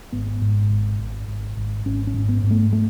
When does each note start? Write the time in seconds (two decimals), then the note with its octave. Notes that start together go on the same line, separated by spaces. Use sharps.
0.12 G#1 B3
0.41 G#2
0.70 G#1
0.99 G#1
1.28 G#1
1.57 G#1
1.86 G#1 C#4
2.07 C#4
2.14 G#2
2.29 B3
2.43 G#2
2.51 A3
2.73 A3